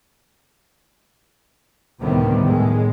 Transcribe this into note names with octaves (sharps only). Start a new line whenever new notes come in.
D2 A2 C3 D#3 G3 B3
A2 G#3